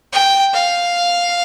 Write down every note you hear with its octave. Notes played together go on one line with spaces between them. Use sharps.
G5
F5